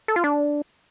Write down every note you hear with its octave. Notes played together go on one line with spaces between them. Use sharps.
A4
F4
D4